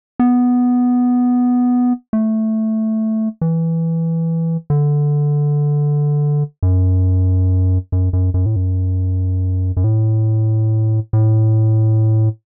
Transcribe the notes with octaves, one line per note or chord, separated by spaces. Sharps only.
B3
A3
E3
D3
F#2
F#2
F#2
F#2
A2
F#2
F#2
A2
A2